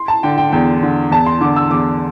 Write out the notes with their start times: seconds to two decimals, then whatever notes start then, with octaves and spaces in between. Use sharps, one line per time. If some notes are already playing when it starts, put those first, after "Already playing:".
Already playing: C6
0.08 A5
0.23 D3 G5
0.38 G5
0.52 E2 G5
0.83 D3
1.11 E2 A5
1.26 C6
1.41 D3 D6
1.56 E6
1.71 E2 D6